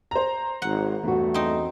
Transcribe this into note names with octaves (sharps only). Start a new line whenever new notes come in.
C5 A#5
G#1 F#5
E2 G2 A3 F#4 A4
C4 D#4